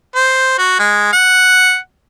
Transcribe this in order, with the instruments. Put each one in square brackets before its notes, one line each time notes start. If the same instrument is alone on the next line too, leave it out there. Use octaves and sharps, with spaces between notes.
[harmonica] C5
F#4
G#3
F#5